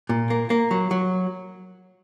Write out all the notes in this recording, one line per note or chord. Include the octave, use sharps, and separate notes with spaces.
A#2
A#3
A#3
F#3
F#3